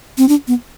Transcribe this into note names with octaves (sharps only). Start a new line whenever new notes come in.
C4
D4
B3